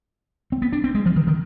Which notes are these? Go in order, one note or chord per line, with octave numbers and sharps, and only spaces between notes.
C4
B3
D4
C4
G#3
F3
D#3
D#3